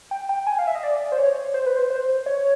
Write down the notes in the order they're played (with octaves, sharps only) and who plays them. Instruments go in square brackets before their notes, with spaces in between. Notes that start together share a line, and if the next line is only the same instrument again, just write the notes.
[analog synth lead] G5
G5
G#5
F5
E5
D#5
D5
C5
C#5
C5
B4
C5
C5
C#5